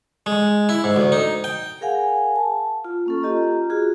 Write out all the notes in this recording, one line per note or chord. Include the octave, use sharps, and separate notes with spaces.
G#3
E4
G#2
D2
D#4
G5
G#4 A#4 F5 F#5 G#5
A5
F4
A#3 C#4 A4
F4 G4 D#5 A#5
F4 F#4 G#4